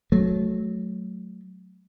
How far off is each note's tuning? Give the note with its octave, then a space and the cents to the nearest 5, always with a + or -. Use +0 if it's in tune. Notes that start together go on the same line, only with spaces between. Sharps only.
F#3 +0 A3 -20